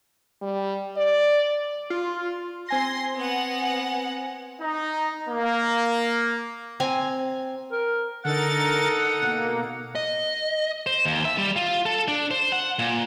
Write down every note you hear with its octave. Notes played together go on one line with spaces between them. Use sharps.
G3
D5
F4
C4 G#5 C6 A#6
B3 F#5
D#4
A#3
C4 G#5 A#5
A#4
D3 D#4 A4 A#4 F#5 A6
B2 A#3
D#5
C5
D#2
E5
G3
F4
A4
D4
C5
F#5
A#2